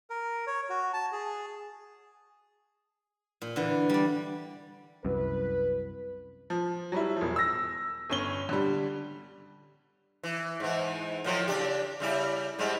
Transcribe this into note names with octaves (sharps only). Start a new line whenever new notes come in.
A#4
C#5
F#4
A5
G#4
A#2
D3 E3
G3 D5
C2 F#2 B4
F3
F#3 G3 E4
E1 F3
E6 A#6
G1 C#4 G7
D3 G3
E3
G#2 E3
A2 F3 F#3
C#3 D4 G4
C#3 G3 E4
G#2 G3 G#3